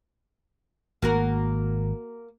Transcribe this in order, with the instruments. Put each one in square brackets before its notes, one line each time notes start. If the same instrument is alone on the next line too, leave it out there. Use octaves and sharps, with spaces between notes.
[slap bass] G#1 [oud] A#3 F#4 A#4